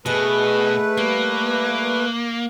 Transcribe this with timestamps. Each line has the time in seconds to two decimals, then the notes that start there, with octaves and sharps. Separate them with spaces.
0.06 B2 A3 G#4 B4 D#5
0.97 G3 A#3